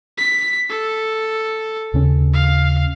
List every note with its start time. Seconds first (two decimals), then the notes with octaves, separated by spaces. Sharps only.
0.18 B6
0.69 A4
1.94 D#2 C#3 C#4
2.34 F5